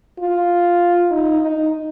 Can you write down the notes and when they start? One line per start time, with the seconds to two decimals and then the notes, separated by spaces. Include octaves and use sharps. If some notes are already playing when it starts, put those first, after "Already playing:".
0.19 F4
1.11 D#4
1.41 D#4